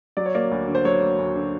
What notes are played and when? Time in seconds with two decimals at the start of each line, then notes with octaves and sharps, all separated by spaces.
0.17 F#3 D5
0.26 C#5
0.34 A#3 D5
0.51 D2
0.68 D3
0.75 C5
0.85 F#3 C#5
1.02 A#3
1.18 D2
1.35 D3